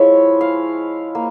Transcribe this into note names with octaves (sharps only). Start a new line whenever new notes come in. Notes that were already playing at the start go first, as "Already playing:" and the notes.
Already playing: F3 G#3 E4 C#5
F5
A#3